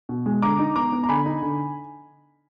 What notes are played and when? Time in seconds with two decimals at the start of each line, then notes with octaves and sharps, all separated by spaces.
0.09 B2
0.26 G#3
0.42 D3 A#5 D6
0.59 D#4
0.76 B3 A#5 D6
0.92 B3
1.03 A#5
1.09 D3 G#5 B5
1.26 D#4
1.42 D3